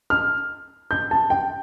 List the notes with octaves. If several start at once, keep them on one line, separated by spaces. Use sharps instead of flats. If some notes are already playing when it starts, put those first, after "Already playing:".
F6
G6
A5
G5